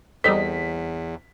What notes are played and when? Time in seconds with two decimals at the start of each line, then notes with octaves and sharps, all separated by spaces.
0.24 E2 G3 C4 D#4 A4 D#5 B6